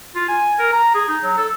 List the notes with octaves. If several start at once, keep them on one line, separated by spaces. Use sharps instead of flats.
F4
G#5
A#4
A#5
G#4
D#4
F#3
A4